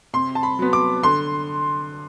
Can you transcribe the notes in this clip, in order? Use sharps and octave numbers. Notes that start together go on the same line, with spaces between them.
C3 C6
A5
B5
F#3 B3
D6
D3 C6